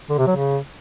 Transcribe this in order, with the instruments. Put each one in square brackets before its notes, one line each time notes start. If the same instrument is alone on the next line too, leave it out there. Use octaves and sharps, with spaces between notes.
[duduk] D3
C3
F#3
C#3